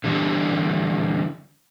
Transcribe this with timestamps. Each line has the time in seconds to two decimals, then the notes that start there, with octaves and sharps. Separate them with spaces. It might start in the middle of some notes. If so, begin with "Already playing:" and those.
0.04 D3 E3 G3 D4 G4